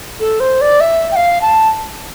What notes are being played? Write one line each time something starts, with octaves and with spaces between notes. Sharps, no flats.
A4
C5
D5
E5
G5
F5
A5